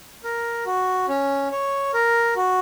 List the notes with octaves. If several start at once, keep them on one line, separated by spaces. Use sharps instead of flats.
A#4
F#4
C#4
C#5
A#4
F#4